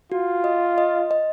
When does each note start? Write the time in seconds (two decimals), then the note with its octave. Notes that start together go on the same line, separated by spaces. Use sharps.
0.12 F4 F#4
0.44 D#5
0.78 D#5
1.11 D#5